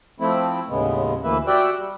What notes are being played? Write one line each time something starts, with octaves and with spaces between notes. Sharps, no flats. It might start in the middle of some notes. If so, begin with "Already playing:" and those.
F3 A3 C4 E4
D#2 A2 C#3 G#3 B3
D2 E3 A#3 B4 E5
F#4 G4 D5 E5 F#5 G5
G3